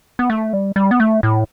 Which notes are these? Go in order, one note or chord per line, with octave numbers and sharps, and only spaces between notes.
B3
A3
G3
G3
B3
A3
A2